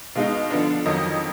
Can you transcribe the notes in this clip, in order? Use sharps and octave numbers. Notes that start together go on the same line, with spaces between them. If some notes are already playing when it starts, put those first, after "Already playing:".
B2 G#3 D#4 F5
D3 F3 B3 D4
F2 D#3 F#3 D#5